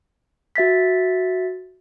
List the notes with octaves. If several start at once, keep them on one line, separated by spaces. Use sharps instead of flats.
F#4 E5 A6 B6